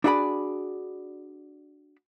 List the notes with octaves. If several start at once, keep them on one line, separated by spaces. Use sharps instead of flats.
D4 E4 F#4 G#4 D5 B5